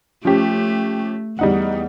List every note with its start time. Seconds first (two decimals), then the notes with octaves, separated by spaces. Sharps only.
0.25 F3 A3 C#4 G4
1.39 E2 G3 D#4 F#5